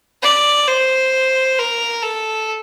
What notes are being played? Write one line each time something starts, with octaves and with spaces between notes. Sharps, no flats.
D5
C5
A#4
A4